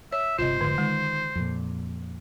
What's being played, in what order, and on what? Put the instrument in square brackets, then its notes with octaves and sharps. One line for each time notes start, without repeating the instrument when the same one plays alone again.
[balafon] C#5 [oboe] E5
[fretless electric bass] G1 C3 [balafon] F4 D#5 [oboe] C5
[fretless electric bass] F1 G#2 [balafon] D3
[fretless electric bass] D#3 [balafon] G#3
[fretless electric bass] F2 A#2